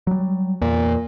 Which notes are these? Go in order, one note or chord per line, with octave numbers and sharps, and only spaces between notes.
F#3 G3
E2 A#2